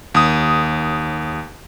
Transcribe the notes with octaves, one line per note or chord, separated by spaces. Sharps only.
D#2 D#6